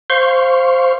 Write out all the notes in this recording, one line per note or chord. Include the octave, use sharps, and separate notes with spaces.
C5 F5 C6 C#6